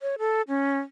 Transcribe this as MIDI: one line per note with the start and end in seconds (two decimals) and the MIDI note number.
0.01 0.15 73
0.19 0.42 69
0.48 0.78 61